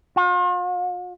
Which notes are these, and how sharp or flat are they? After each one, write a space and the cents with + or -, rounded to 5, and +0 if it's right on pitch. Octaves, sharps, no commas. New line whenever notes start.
F4 +45